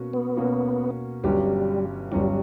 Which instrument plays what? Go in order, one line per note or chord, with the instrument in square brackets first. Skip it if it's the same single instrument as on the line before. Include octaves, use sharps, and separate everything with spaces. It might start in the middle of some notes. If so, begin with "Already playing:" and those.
Already playing: [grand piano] B2 A#3 C#4 F#4
[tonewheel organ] B3
[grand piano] B2 A#3 C#4 F#4
[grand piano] G1 G2 F#3 C#4 G4 [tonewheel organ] G3
[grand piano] G1 G2 F#3 C#4 G4 [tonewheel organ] G3